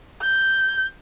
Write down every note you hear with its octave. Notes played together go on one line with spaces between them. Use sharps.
G6